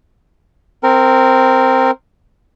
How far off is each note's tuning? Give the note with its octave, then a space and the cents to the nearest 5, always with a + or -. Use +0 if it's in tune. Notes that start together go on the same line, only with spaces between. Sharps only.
C4 +0 A#4 -15